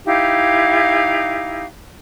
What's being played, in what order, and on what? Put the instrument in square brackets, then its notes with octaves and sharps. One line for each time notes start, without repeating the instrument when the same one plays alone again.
[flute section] D#4 E4 G4 F5